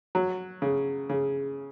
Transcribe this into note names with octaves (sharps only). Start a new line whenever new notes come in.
F#3
C#3
C#3